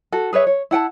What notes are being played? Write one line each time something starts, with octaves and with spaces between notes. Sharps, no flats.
F#4 A4
G#4 B4 C#5 E5
C#5
E4 F#5 G5 A5